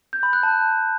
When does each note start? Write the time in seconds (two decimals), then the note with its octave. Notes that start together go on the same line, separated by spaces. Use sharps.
0.13 G6
0.23 B5
0.33 F#6
0.43 A5